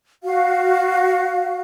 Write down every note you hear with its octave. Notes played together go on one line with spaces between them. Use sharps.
F#4 F5